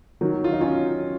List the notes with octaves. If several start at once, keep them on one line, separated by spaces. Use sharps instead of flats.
D#3 F#3
F4
D#4
C#4 F4